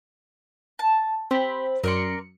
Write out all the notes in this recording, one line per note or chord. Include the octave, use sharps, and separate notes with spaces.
A5
C4 G4 B5
F#2 A#4 D5 C6 C#7